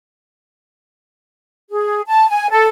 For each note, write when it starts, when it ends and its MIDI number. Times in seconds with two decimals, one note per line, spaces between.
1.70 2.01 68
2.07 2.26 81
2.29 2.50 80
2.50 2.68 69